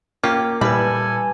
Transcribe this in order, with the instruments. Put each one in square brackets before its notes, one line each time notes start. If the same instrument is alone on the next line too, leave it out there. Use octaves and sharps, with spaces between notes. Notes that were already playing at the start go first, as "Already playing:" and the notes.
[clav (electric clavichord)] A#3 C#4 F4 [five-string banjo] G4
[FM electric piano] A#2 B4 [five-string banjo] E3 B5 [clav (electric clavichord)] G3 [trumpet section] A4 G#5